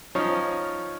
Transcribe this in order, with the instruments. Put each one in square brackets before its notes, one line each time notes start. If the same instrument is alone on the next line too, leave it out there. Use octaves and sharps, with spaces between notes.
[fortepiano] F3 C#4 D#4 C#5 D#5 F5